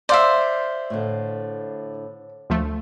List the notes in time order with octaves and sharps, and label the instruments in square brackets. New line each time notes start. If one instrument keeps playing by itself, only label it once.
[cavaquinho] C5 E5 [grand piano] D5 F5
[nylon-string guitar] A2 D3
[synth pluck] D2 F3 A3